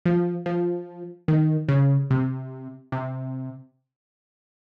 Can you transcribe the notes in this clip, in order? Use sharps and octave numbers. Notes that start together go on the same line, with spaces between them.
F3
F3
D#3
C#3
C3
C3